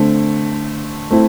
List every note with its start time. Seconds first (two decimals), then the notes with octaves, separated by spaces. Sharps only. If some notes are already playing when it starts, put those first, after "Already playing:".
Already playing: D3 A3 C4
1.11 A3 C4 E4